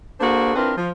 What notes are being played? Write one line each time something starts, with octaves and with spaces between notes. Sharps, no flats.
A#3 D4 F#4 G#4 A4 C5
C4 D4 E4 F4 A#4 B4
F3